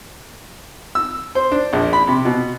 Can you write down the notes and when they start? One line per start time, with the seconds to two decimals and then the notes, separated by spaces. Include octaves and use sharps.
0.95 E6
1.35 C5
1.52 D4
1.73 A#1
1.93 B5
2.07 C3
2.25 B2